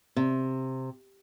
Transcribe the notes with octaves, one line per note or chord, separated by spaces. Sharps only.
C3